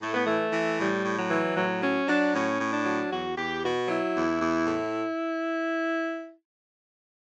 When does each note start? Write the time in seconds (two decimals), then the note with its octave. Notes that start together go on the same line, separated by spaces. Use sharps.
0.02 A2 A3
0.14 B3
0.26 E3 A3
0.53 E3
0.79 A2 G3
1.05 A2
1.17 F#3
1.31 E3
1.56 A2 F#3
1.82 F#3 C#4
2.08 F#3 D4
2.34 A2 C#4
2.60 A2
2.73 D4
2.85 F#3
3.11 E2 F#4
3.37 E2 G4
3.62 B2 F#4
3.88 F#3 E4
4.14 E2
4.40 E2
4.66 A2